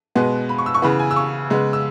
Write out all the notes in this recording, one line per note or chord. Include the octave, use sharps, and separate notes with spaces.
B2 G#3 B3
B5
C#6
E6
C#6
C#3 E3 B3 B5
G#5
E6
C#6
C#3 G#3 B3
E6